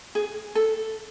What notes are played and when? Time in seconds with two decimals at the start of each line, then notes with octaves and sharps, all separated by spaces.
0.15 G#4
0.55 A4